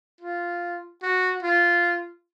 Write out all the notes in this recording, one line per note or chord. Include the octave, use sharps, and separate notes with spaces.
F4
F#4
F4